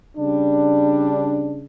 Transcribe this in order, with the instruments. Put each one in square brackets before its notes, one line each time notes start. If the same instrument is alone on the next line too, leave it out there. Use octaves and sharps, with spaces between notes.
[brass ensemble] C#3 G3 D4